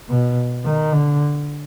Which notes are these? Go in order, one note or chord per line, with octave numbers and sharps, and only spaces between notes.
B2
D#3
D3